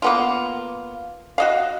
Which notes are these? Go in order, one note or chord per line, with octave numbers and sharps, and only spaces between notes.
A#3 B3 F4
F#4 D#5 F5